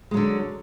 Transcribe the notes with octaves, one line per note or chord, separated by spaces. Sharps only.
D3 F#3 G#3